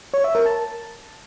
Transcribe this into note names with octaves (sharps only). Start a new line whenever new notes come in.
C#5
E5
A#4
A5